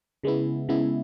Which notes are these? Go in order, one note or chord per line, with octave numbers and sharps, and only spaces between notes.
C#3 G#3 B3 E4
C#3 G#3 B3 E4